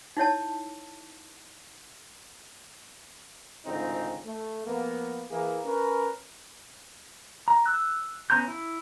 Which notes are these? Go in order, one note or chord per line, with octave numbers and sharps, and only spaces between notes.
D#4 E4 C#5 A5
G#1 D2 C#3 C4 D#4 F4
A3
F2 A#3 B3
E3 A#3 G#4
C#4 A#4 B4
A#5
E6 F#6
B3 C#4 A#5 C6 G6
E4